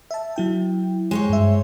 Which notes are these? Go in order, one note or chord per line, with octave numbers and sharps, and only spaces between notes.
E5 A5
F#3 E4 G5
G#3 C5 C#5
G2 E5